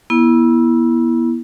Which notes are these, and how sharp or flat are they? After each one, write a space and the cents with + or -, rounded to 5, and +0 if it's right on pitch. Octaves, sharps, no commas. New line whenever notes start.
B3 -35 E4 +0